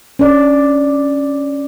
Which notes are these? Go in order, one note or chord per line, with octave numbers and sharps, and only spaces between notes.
C#4 D5